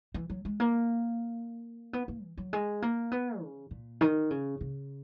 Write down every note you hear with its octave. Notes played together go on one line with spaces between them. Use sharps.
E3
F#3
G#3
A#3
B3
A#3
E3
F#3
G#3
A#3
B3
C#3
A#2
D#3
C#3
C#3